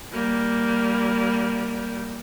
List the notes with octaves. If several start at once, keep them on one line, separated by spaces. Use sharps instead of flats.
G3 A#3